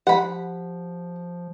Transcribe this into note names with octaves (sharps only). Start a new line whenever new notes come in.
F3 G4 F#5 B5